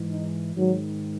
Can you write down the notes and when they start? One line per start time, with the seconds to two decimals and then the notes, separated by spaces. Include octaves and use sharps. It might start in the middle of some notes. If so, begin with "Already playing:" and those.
Already playing: G#2 E3
0.10 D#4
0.55 G#2 D#3 F#3